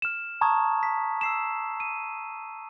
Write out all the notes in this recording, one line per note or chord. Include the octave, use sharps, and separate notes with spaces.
F6 E7
A5 A#5 C#6 D#6 G#6
B6
E6 C7 E7
D#7